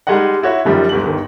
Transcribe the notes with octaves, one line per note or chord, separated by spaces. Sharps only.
G3 G#3 D#4 D#5 F#5
E4 F#4 C#5 E5
F#2 D#3 F3 G3
G1 G#2 F#7
G1 D#3